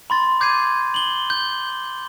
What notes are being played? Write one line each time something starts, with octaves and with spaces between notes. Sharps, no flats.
B5 C6 A6
D6 G6 G#6 C7 D#7
F#7 G7
G6